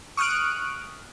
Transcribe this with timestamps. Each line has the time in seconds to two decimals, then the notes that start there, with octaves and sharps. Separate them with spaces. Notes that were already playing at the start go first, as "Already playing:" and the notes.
0.17 C#6 D#6 F6 F#6 D7